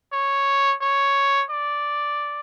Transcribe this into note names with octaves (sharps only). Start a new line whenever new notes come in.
C#5
C#5
D5